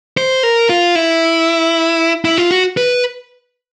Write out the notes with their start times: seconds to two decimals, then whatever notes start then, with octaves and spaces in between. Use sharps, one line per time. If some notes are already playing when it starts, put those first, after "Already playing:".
0.17 C5
0.43 A#4
0.69 F4
0.95 E4
2.25 E4
2.38 F4
2.51 F#4
2.77 B4